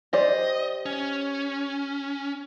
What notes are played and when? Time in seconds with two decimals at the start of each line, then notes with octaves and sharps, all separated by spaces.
0.13 G4 C5 D5 D#5
0.86 C#4